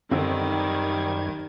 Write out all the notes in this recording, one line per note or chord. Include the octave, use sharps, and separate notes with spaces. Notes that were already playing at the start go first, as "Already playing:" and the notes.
F#2 D3 D#3 G3 C4 D#4 G#6